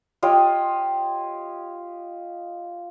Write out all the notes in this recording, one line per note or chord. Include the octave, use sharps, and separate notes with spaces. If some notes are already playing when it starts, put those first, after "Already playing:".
F4 G4 C#5 D#5